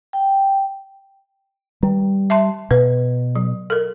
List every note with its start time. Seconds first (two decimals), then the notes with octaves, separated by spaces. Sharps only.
0.13 G5
1.83 D#3 G3
2.30 E5 A5 C6
2.71 B2 B4
3.36 F#3
3.70 A4 A#4